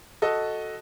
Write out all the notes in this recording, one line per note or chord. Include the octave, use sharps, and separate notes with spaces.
F#4 A4 D#5